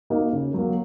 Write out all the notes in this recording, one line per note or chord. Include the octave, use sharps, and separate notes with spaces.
A#3 D#4 F#4
C#3
F#3 A#3